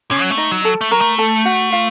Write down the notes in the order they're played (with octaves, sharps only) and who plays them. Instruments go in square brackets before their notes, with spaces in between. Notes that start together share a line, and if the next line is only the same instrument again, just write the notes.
[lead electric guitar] C3 [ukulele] C#4 C#5
[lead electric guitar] F#3
A3
[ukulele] D#4 D#5
[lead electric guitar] F#3
[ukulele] A4 A5
[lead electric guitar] A3
[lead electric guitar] F#3 [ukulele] A#4 A#5
[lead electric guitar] A3
[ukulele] A4 A5
F#4 F#5
F4 F5